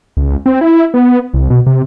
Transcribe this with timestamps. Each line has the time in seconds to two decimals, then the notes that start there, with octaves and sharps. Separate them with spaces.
0.17 C#2
0.46 C4
0.61 E4
0.94 B3
1.34 C2
1.50 B2
1.67 C3